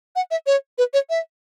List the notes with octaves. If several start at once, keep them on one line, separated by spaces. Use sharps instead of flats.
F#5
E5
C#5
B4
C#5
E5